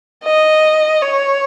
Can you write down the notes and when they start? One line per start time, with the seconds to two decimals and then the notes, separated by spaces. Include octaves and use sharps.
0.24 D#5
1.02 C#5